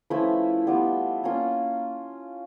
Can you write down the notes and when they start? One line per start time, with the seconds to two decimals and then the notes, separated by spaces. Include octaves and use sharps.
0.10 F3 A3 C#4 E4 B4
0.67 G3 B3 D4 F4
1.24 A#3 C#4 F4